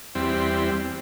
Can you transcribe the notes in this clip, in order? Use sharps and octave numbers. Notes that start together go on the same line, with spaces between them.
E2 G3 C4